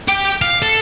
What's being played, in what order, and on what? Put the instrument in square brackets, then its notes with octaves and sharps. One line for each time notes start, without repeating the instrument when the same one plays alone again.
[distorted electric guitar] G4
F5
A4